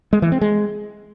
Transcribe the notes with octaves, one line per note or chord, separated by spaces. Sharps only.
G#3
E3
C4
G#3